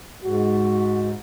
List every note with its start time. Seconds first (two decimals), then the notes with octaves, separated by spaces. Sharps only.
0.23 G#2 F#4